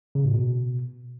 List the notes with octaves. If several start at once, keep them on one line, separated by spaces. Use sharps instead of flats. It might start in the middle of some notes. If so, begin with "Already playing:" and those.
C#3
A2
B2